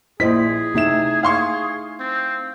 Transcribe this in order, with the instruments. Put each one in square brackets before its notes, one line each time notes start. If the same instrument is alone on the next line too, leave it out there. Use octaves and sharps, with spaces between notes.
[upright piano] A#1 B6 [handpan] E4 C5 D#5 [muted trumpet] G#4
[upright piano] C3 E7 [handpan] A3 D#4 E5
[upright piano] F5 C6 C#6
[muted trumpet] C4